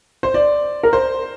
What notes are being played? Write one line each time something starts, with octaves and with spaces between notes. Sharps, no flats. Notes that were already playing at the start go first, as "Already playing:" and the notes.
C5
D5
A#4
C5